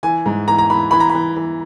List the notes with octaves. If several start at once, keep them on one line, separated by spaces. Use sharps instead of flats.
E3 G#5
G#2
E3 A#5
A#5
E3 B5
E3 B5
A#5
B5
E3
E3